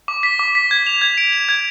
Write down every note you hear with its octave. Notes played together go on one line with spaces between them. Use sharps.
D6
B6
D6
B6
G#6
F7
G#6
D7
F7
G#6